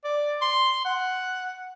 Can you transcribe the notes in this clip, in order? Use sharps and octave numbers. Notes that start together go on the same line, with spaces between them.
D5
C6
F#5